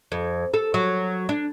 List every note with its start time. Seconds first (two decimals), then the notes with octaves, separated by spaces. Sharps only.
0.12 F2
0.54 A4
0.74 F#3
1.29 D4